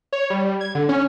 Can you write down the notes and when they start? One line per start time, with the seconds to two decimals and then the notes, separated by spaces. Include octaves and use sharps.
0.13 C#5
0.30 G3
0.61 G#6
0.75 D3
0.89 C#4